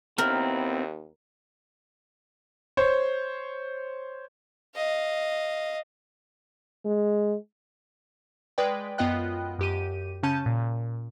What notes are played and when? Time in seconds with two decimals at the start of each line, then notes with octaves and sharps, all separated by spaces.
0.18 D#2 B3 C4 E4 A#4
2.77 C5 C#5
4.75 D#5 F5
6.85 G#3
8.58 G#3 B4 D5 G5
8.98 F#2 B3 F4 D#5 G5 F#6
9.59 F#2 G4 D#7
10.23 C#3 C#4 A5 G6 D#7
10.46 A#2